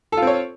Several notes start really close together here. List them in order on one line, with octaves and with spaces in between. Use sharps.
A4 F4 C4 C#5